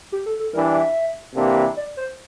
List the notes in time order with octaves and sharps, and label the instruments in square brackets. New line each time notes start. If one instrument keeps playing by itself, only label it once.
[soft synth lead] G4
A4
A4
[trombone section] E3 G3 D4 [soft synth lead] A#4
[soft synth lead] E5
[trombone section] C3 E3 A#3 D4 G4
[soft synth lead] D5
C5